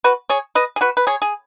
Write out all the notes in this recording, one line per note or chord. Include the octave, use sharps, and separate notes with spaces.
F#4 B4
G#4 C#5
B4 D#5
G#4
F#4 B4
B4
G#4 C#5
G#4